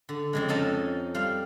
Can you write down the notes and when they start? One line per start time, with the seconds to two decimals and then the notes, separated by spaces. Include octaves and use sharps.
0.09 D3
0.33 F2 C#3 G#3
0.48 F3 C#4 D#4 A4 A5 A#5
1.14 G3 F5 C6